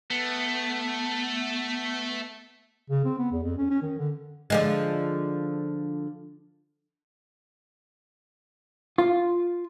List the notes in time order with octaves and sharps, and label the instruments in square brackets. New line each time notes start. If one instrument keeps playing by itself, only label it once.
[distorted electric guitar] A3 [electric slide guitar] B3
[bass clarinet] C#3
C4
B3
E2
F2
C#4
C#4
D#3
D3
[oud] D3 F3 G#3
[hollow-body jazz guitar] F4